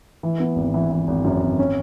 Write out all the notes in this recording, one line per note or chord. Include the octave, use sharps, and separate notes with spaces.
E3
B3
G#1
E3
E3
G#1
F#2
G#1
C#4